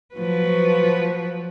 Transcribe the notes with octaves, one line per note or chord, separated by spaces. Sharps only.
F3 F#3 B4